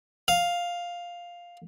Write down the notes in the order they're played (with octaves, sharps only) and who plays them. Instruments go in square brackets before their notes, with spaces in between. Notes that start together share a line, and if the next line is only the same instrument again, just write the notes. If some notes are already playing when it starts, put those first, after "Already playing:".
[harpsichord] F5